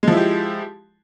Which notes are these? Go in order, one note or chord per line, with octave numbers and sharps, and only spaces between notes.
F3 G#3 E4 G4